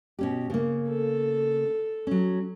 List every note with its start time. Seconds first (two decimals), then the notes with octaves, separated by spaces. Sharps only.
0.19 B2 C#4 G4
0.50 C#3 A#3
0.88 A4
2.07 F#3 C#4